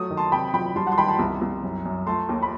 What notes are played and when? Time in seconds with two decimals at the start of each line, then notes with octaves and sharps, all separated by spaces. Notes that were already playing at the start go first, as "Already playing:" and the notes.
Already playing: F#3 A3 D#6
0.10 D#3
0.17 A5 C6
0.32 C3 G5 B5
0.54 F#3 G5 B5
0.76 G3 A5 C6
0.87 F#5 A5
0.92 C6
0.97 D#3 G5 B5
1.08 A5 C6
1.19 C2
1.41 C2
1.63 F#2
1.85 F#2
2.07 A3 A5 C6
2.29 D#2
2.42 B5